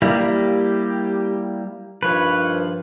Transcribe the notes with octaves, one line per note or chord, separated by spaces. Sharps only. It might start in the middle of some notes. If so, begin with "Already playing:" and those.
G3 A#3 E4 G4
G2 D#3 F3 B4 C#5